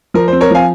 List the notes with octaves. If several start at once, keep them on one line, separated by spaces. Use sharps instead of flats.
F3 A#4
C5
C4
A#4 C#5
F3 F5 G#5